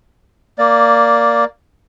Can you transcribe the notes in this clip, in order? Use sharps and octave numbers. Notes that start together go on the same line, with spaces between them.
A#3 D5